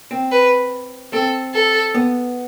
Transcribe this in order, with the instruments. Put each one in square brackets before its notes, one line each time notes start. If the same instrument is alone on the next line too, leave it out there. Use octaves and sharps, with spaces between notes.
[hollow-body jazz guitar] C4
[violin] B4
[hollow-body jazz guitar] C4 [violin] A4
[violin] A4
[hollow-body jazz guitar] B3